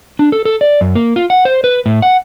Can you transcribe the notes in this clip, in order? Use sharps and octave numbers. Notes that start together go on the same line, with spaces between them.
D4
A4
A4
D5
F#2
A#3
F4
F#5
C5
B4
A2
F#5